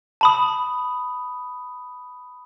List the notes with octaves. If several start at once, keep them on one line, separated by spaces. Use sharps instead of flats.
A5 B5 D#6